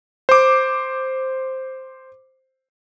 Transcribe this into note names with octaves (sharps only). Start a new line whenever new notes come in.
C5 D6